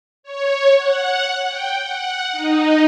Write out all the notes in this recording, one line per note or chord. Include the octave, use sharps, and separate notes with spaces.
C#5
F#5
G5
F#5
D#4